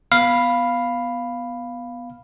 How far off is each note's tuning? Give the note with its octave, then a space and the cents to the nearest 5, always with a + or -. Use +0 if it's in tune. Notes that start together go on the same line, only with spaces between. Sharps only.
B3 +0 F5 +0 B5 +0